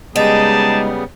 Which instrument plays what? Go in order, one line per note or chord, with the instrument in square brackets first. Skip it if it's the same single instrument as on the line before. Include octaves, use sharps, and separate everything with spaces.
[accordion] C#3 G3 B3 [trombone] G#3 [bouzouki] D#4 [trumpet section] G4 G#4 A5